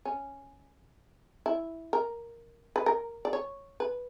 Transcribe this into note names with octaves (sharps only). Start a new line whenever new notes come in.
C#4
E4
A#4
B4
A#4
D5
C#5
B4